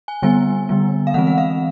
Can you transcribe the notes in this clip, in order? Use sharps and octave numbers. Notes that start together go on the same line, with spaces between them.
G#5
D3 G3 B3 G#5
D3 G3 B3
F5
E3 G#3 C4 F#5
F#5
F5